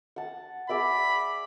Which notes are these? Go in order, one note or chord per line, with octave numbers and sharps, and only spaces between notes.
F#5 A5
G#4 D5 E5 B5